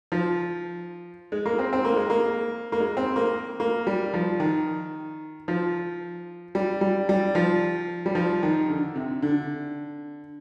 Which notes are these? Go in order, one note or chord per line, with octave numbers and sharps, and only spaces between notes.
F3
G#3
A#3
C4
C4
A#3
G#3
A#3
A#3
G#3
C4
A#3
A#3
G3
F3
D#3
F3
G3
G3
G3
F3
G3
F3
D#3
D3
C3
D3